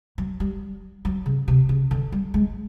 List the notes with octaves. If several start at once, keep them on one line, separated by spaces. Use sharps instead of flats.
F#3
G3
F#3
C#3
C3
C#3
D3
G3
G#3